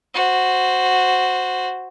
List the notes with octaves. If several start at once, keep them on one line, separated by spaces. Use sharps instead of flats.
F#4 C5